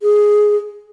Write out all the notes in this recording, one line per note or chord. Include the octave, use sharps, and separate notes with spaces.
G#4